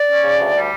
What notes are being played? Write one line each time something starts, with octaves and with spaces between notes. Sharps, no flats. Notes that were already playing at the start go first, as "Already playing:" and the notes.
Already playing: D5
C#4
C#3
D2
G3